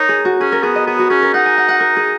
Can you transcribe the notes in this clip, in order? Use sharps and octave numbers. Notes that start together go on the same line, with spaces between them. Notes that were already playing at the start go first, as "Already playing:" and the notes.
Already playing: D#4 A#4 C#5
G#4
F#4
C#4 G#4
A#4
B3 G#4
D#5
B3 G#4
F#4
C#4 G#4
A#4
D#4 F#5
G#5
F#5
F#5
A#4
G#4